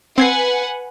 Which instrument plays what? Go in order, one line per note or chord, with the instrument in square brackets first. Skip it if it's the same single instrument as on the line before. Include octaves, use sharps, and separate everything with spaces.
[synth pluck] C4 G#6 C7 [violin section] B4 F#5 G#5